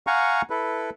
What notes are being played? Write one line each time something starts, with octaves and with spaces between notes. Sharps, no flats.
F5 F#5 G#5 A#5 C#6
E4 A4 B4